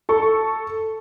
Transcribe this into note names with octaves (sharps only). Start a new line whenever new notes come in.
A4 C#6